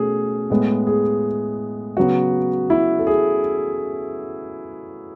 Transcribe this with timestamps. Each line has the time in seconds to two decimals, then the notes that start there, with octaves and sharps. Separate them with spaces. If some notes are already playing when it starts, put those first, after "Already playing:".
Already playing: B2 A3 C#4 G#4
0.50 A2 G#3 B3
0.87 G#4
1.97 C#3 F#3 B3 F#4
2.70 E4
2.99 A4
3.07 G#4